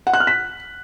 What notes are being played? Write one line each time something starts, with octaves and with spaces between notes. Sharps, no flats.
F#5
F#6
F6
B6